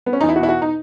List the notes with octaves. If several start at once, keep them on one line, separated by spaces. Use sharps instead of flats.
B3
C#4
D#4
E2
E4
F#4
B2 E4
F#4
D#4